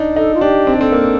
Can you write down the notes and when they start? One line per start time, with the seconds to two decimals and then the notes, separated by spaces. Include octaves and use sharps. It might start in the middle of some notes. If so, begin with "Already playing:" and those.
Already playing: D4 D#4
0.16 D#4 A4
0.35 F4
0.41 D4 G4
0.67 C4
0.74 D4
0.79 C4 A4
0.92 A#3